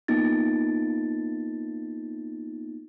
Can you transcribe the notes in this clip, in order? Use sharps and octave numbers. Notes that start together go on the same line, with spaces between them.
A#3 B3 D#4 F4 A6